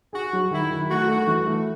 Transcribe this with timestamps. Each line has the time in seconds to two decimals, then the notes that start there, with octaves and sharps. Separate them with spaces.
0.13 F#4 G#4
0.33 F#3
0.51 D#3 E4
0.71 D#3
0.89 A3 F#4
1.08 A3
1.27 E3
1.46 A3